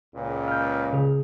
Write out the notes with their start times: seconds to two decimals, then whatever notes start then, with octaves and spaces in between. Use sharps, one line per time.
0.15 C#2 A#2
0.48 F6 G6
0.93 C#3 G#4